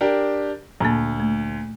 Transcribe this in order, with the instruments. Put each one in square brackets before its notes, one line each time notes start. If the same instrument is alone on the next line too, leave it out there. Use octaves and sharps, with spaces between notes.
[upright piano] D4 G4 A#4
[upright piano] D2 [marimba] A#2 A#3
[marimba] A3